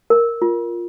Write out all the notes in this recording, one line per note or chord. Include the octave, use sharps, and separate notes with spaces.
A#4
F4